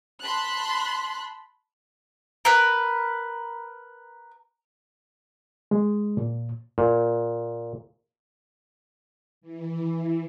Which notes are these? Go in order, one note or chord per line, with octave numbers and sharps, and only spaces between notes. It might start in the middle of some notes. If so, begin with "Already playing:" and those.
A5 B5 C6 F#6
A#4 B4
G#3
A#2
A#2
E3